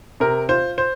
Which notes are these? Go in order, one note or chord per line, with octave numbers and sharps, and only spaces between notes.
C3 A#4
F4 C5
C5